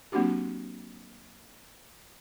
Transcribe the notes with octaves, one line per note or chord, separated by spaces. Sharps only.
F#3 A#3 C4 D4 F#4 G4